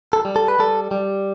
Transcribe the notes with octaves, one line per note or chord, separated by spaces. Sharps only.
A4
G3
A4
B4
G3 A4
G3